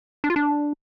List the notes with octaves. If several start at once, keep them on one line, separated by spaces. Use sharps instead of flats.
D4
F4
D4